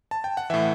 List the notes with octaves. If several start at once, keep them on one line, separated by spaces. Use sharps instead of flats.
A5
G5
F#5
A2 E3 E5